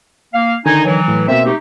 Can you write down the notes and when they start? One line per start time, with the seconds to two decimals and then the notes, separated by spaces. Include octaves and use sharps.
0.34 A#3 F5
0.66 D3 D#3 D#4 G#5
0.85 E3 F#3
1.08 A2
1.28 B2 A#3 C4 E5
1.46 A3 D#4 G4